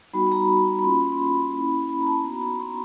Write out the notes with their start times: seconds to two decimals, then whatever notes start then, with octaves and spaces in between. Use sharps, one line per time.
0.13 G3 B3 D#4 F#4 B5
0.26 B5
0.32 A#5
0.79 B5
0.84 A#3 C#4 F4 C6
1.01 B5
1.12 C6
1.24 B5
1.54 A#3 C#4 E4
1.89 B5
2.01 A#5
2.06 A5
2.24 B3 D#4 F#4 A#5
2.34 B5
2.42 A#5
2.60 C6